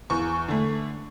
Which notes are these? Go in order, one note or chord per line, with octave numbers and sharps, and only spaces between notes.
E2 C#6
D3 A3